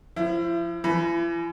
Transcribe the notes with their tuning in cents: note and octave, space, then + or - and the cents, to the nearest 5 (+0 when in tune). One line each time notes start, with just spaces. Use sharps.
F3 +0 E4 +40
E3 +40 B5 +0